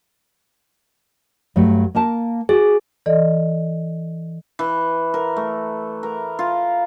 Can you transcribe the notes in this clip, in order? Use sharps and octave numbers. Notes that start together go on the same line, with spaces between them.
G2 F#3 A3
A#3 A#4 A5
F#4 G#4
E3 A4 D5 D#5
E3
A#4
A3
A#4
F4